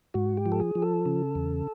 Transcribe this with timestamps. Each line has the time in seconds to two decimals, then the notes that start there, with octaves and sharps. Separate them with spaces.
0.14 G#2 F#4
0.37 G4
0.46 F3
0.52 A4
0.60 G#4
0.75 F3
0.82 A4
1.06 C#3
1.35 E2